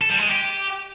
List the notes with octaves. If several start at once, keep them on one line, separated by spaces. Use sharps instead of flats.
A4
G3
G#3
G4